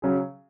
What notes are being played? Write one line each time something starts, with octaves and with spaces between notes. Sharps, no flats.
C#3 F#3 C#4 G#4